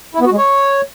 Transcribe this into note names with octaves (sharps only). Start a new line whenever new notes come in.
E4
B3
F#4
G#3
C#5